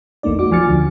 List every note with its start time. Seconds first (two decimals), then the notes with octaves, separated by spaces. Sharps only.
0.23 A#1 F2 A3 A#3 D#4 D5
0.39 F#4 D6
0.51 F3 G#5 D6 F6 A6 C#7
0.68 D2 D3